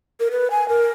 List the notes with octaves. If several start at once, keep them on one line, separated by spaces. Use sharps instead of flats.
A#4
B4
G#5
A#4